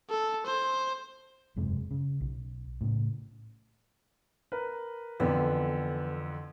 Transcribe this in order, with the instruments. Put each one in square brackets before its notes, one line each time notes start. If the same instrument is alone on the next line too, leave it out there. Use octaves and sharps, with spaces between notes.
[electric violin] A4
C5
[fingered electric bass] E1 F#2 C3 G#3
C#3
B1
A2 C#3
[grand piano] A#4 B4
[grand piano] F2 D3 E3 [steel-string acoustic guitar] B3